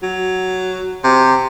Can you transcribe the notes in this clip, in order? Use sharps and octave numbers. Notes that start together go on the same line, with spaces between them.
F#3
C3